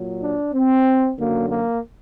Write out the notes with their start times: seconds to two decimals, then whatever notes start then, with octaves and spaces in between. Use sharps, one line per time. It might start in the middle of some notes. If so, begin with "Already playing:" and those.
Already playing: A#2 F#3
0.23 D4
0.55 C4
1.19 F#2 D3 F#3 A#3
1.50 A#3